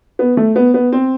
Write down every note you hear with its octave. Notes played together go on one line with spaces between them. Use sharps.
B3
A3
B3
B3
C4